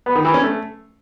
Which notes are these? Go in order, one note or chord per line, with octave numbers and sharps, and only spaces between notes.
B3
D#3
E3
C#4
A3